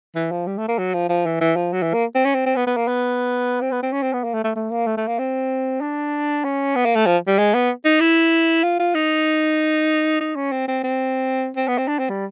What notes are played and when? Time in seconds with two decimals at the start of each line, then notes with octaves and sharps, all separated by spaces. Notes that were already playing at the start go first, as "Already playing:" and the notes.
0.15 E3
0.31 F3
0.47 G3
0.58 A3
0.68 A#3
0.78 F#3
0.94 F3
1.09 F3
1.26 E3
1.41 E3
1.56 F3
1.73 F#3
1.82 E3
1.94 A#3
2.15 C4
2.25 C#4
2.35 C4
2.46 C4
2.56 B3
2.67 B3
2.77 A#3
2.88 B3
3.61 C4
3.71 B3
3.83 C4
3.92 C#4
4.03 C4
4.13 B3
4.24 A#3
4.34 A3
4.44 A3
4.56 A3
4.71 A#3
4.87 A3
4.97 A3
5.07 A#3
5.19 C4
5.81 D4
6.44 C#4
6.75 B3
6.85 A#3
6.96 A3
7.06 F3
7.27 G3
7.39 G#3
7.54 B3
7.85 D#4
8.00 E4
8.63 F4
8.79 F4
8.95 D#4
10.21 D#4
10.36 C#4
10.52 C4
10.68 C4
10.83 C4
11.57 C4
11.68 B3
11.78 C4
11.88 D4
11.99 C4
12.09 G3